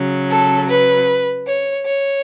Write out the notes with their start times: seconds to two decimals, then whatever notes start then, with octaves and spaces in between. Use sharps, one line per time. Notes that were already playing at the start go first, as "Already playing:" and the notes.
Already playing: C#3 F#3
0.30 A4
0.69 B4
1.46 C#5
1.85 C#5